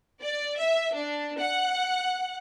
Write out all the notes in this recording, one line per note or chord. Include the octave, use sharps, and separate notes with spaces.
D5
E5
D4
F#5